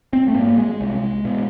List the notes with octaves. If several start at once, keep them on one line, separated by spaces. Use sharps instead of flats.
C4
A3
G#2 A#3
G#3
C2
B2